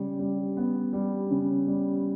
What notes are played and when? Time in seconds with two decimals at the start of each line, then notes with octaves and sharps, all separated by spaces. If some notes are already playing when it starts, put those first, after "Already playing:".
Already playing: C#3 G3
0.19 G3
0.57 B3
0.93 G3
1.31 C#3
1.67 G3